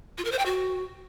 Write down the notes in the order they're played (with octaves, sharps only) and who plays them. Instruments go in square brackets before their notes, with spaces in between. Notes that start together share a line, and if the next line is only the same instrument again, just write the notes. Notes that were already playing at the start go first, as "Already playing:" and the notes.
[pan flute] F4
A#4
C5
G5
F#4